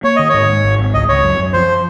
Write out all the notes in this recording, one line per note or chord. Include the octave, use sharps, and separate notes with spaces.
A#3 C#5
D#3 D#5
G#2 C#5
G#2
G#1
G#1
C#2 D#5
C#2 C#5
F#2
F#2
F3 C5